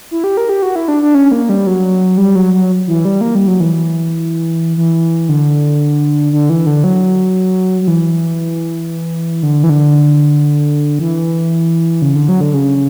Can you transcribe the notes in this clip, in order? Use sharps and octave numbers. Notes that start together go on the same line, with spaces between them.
E4
G4
A#4
G4
F#4
E4
D4
D4
C#4
A#3
G3
F#3
G3
F#3
F#3
E3
G3
A#3
G3
F#3
E3
E3
D3
D3
E3
D3
F#3
F#3
E3
D3
E3
D3
E3
C#3
D3
F#3
D3
C#3